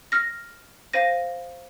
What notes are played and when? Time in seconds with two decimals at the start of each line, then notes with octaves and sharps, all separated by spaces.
0.12 F6 A#6
0.93 C5 F5 A#6 D#7